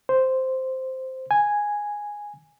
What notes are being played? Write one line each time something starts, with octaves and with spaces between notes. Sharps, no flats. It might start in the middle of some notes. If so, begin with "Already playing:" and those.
C5
G#5